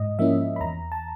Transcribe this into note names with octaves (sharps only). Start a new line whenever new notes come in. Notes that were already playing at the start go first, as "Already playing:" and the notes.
Already playing: G#2 D#5
F3 A#3 C#4 E4 E5
B5
E2 A#5
A5